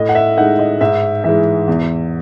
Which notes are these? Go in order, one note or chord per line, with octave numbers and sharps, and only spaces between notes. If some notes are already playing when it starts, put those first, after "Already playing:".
Already playing: A2 D#5
F#5
E5
G#3 D#4 F#5
D#5
G#2 E5
E3 G#3 E5
E2